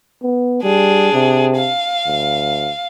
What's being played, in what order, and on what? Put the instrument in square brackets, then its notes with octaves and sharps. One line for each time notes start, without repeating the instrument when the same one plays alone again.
[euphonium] B3
[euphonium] G3 [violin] D4 G#4
[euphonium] C3
[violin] F5
[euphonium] D2